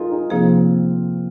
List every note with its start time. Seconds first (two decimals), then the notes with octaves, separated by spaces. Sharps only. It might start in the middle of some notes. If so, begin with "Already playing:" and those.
Already playing: D#4 F4 G#4 A#4
0.11 D#4 G#4
0.30 C3 F3 A#3 C4 D#4 F4 G#4
0.58 C4